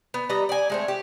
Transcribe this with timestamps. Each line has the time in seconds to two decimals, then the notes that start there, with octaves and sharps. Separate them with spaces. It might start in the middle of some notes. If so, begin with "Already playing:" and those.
0.14 B3
0.29 G3 B4 D#5 A#5
0.49 D5 G#5
0.70 G#3 A3 C4
0.88 G4